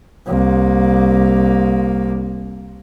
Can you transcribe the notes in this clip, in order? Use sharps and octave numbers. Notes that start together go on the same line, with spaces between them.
C2 A#3